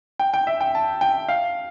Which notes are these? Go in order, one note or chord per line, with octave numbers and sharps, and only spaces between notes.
G5
G5
E5
G5
A5
G5
F5